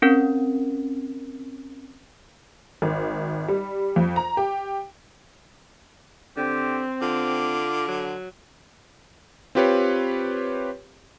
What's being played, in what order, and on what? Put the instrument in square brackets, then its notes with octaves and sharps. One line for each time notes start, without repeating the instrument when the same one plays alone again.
[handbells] C4 C#4 A#4
[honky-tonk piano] G#1
G3
F2
A#5
G4
[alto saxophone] D3 [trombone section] C4 [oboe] G4
[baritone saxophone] D3 [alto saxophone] F4 [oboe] D6
[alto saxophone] F#3
[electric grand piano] C4 F4 G4 B4 C#5